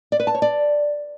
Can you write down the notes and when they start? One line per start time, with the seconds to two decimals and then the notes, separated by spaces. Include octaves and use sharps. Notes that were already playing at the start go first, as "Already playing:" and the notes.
0.12 D5
0.20 B4
0.27 A5
0.34 C#5
0.42 D5